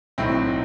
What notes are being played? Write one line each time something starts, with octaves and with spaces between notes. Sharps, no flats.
B1 A2 F#3 C4 E4